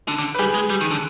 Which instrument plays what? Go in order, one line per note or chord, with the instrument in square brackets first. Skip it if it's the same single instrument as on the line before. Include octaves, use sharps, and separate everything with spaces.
[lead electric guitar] D3
D3
[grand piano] B4
[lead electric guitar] G3 [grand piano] G#4
[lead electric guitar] G#3
G3
D#3
D3